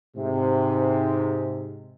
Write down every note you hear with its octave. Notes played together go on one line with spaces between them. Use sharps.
G#2 C3